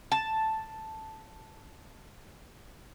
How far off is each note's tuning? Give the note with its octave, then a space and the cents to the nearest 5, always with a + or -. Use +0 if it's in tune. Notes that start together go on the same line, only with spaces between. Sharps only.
A5 +0